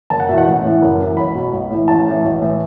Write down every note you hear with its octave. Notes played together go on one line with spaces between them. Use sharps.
F#1 A5
F#5
E2 B2 E5 F#5
A1 F#5
A2 E3
F#1
F#2 E3
B1 B5
B2
B1
A2 E3
A1 A5
A2 E3
B1
A2 E3